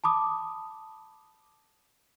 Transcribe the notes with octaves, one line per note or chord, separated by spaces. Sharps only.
A5 B5 D6 D#6